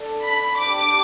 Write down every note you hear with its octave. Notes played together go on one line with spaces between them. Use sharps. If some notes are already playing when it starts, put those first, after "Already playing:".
Already playing: D4 A4
B5
D4 G4 D6